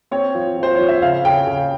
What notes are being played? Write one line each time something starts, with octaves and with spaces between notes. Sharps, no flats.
C4 C#5
F3
F3
C5
F3 C#5
E5
C#3 F5
C#3 G5
C#3